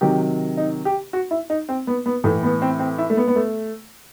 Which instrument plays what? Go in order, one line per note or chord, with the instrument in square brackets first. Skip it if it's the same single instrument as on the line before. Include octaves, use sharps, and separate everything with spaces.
[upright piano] C3 D#3 F#3 G4
D#4
G4
F#4
E4
D#4
C4
B3
B3
A2 E3 A3
B3
C4
C4
E4
A3
B3
B3
A3